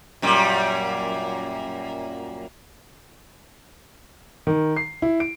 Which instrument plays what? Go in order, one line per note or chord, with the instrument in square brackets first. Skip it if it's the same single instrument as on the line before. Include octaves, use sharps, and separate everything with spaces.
[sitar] F#2 A#2 G3
[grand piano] D#3
C7
E4
D7